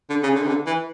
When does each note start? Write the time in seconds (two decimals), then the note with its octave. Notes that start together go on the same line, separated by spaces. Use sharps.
0.10 D3
0.23 C#3
0.35 D3
0.43 C#3
0.48 D3
0.66 E3